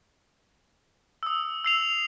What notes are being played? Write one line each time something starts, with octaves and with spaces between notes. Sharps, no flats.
D#6 E6
E6 C7 F7